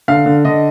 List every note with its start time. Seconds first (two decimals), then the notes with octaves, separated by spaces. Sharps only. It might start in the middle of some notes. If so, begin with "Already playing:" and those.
0.08 D3 F5
0.26 D3
0.45 D3 D#5